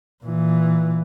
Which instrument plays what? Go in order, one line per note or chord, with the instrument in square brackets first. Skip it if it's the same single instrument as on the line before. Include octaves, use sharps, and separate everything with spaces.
[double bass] A#2 E3